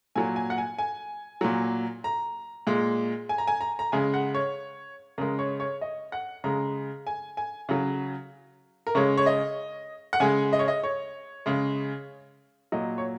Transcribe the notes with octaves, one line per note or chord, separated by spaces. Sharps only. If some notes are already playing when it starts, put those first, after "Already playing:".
A#2 F#3 G#5
G#5
F#5
G#5
G#5
A#2 F#3
A#5
A#2 G#3
G#5
A#5
G#5
A#5
A#5
C#3 G#3 G#5
F#5
C#5
C#3 G#3 A#4
C#5
C#5
D#5
F#5
C#3 G#3 A#5
G#5
G#5
C#3 F#3
A#4
C#3 G#3 C#5
C#5
D#5
F#5
C#3 G#3 G#5
D#5
C#5
D#5
C#5
C#3 G#3
A#2 F#3 D#5
C#5